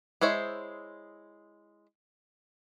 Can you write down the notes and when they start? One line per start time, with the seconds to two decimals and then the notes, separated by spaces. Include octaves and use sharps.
0.21 G#3 E4 C5 C#5